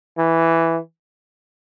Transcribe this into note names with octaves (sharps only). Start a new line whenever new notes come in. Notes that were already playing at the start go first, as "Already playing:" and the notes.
E3